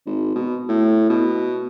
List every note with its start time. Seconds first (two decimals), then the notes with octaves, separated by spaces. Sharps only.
0.06 G#1
0.35 B2
0.68 A2
1.09 B2